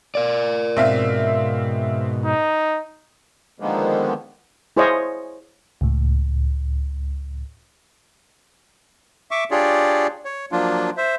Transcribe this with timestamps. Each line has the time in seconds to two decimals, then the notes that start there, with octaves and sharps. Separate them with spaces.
0.15 A#4 D5
0.77 G#2 B2 C4 E5 F5
2.25 D#4
3.60 D3 D#3 F3 G#3 A#3 B3
4.77 E4 G#4 C5 C#5 D#5 F5
5.81 C#2 A2
9.31 E5 C#6 D6
9.51 D4 F4 G4 G#4 C#5 D5
10.25 C#5
10.52 F3 F#3 A#3 D4 F4
10.97 C5 E5